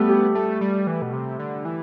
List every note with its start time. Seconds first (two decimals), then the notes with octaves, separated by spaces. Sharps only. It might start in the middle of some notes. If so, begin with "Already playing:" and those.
Already playing: G3 A3 B3
0.09 G4
0.35 A3
0.61 G3
0.87 E3
1.02 B2
1.13 C3
1.39 D3
1.65 E3